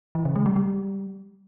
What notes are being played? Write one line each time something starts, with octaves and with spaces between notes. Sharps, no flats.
E3
C#3
G#3
G3
G3